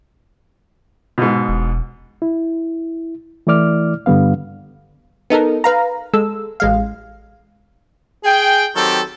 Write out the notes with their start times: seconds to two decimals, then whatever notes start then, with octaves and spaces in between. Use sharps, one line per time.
1.18 G#2 B2
1.49 E1
2.22 E4
3.47 E3 A3 E4 D5 D6 F6
4.06 G2 D3 G3 B3 F5
5.30 B3 D#4 A4 A#4
5.64 B4 F5 A#5
6.14 G#3 A4 E6
6.60 A1 G#3 F5
8.24 G#4 G5
8.75 D#3 F#3 C4 G4 A4